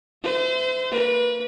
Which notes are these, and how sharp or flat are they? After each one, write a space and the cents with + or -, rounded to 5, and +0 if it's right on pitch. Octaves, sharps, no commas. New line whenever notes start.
C5 -35 E5 +0
A#3 -25 B4 -30